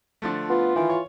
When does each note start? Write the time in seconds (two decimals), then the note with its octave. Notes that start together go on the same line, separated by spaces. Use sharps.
0.22 D3 F3 A3
0.50 B3 F4
0.76 D#3 E3
0.89 C#5